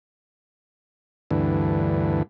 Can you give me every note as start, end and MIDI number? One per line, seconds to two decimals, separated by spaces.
1.31 2.23 38
1.31 2.23 43
1.31 2.23 52